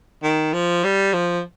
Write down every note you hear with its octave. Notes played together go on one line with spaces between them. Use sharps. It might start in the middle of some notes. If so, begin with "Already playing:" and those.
D#3
F3
G3
F3